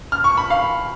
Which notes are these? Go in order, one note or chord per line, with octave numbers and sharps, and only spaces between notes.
F6
C#6
B5
F5